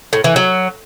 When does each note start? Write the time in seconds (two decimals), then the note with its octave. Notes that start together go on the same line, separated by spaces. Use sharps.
0.13 A2
0.24 E3
0.36 F#3